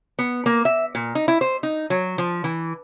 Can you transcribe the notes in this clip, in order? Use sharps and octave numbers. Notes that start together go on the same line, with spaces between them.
B3
A#3
E5
A#2
D#4
E4
C5
D#4
F#3
F3
E3